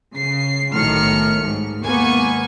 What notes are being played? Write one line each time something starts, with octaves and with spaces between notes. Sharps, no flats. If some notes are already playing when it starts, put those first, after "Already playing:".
C#3 C7
B1 A2 D#3 F6 C#7
G#2
D#2 G#2 A#3 B3 G#5 C#6